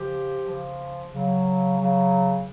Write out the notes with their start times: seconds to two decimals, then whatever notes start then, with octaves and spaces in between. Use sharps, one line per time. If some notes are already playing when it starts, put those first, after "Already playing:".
Already playing: C#3 F3 G4
0.43 C#3 F3
1.11 C#3 F#3
1.78 C#3 F#3